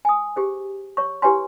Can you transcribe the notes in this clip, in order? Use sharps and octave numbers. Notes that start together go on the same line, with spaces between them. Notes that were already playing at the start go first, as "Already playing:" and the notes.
G#5 D#6
G4 G#4 C5
C#5 C#6
E4 G4 B4 C#5 G#5 C6